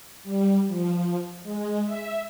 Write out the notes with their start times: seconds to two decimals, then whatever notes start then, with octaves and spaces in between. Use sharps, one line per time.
0.24 G3
0.68 F3
1.43 G#3
1.85 E5